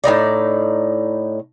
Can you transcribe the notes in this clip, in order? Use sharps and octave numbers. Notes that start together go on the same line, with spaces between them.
A2 B3 D#4 D5